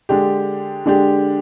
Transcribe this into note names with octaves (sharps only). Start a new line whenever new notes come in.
D3 G#3 D4 G4
D3 G#3 D4 G4